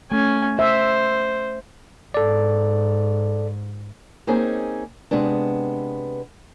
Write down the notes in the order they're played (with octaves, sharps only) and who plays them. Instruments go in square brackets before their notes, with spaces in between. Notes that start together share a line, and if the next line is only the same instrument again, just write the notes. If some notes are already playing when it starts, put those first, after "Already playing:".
[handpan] A3 [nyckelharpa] C#4 G#5
[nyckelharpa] C5 [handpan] E5
[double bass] G#2 [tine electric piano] A4 D5
[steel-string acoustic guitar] A#3 C4 C#4 D#4 G#4
C3 G#3 B3 D4